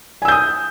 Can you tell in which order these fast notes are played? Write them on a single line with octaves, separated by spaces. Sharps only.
G#5 E6 G6 D#6